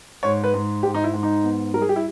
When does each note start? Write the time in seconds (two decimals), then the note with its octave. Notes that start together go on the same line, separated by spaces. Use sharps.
0.23 G#2 C#5
0.44 B4
0.54 G#2
0.83 G#2 G4
0.94 D#4
1.04 E4
1.14 G#2
1.23 D#4
1.44 B3
1.74 G3 A#4
1.82 G#4
1.89 G4
1.96 E4